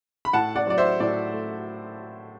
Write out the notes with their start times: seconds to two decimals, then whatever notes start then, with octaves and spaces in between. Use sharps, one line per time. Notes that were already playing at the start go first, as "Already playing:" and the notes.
0.25 B5
0.33 A2 F#5 A5
0.56 D5 F#5
0.67 F#3 D5
0.78 C5 E5
1.00 A2 D5
1.33 A3